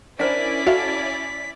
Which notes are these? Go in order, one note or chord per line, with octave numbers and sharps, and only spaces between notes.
C#4 D4 E4 A#4 C5 D5 B6
F#4 A4 E5 F5 A5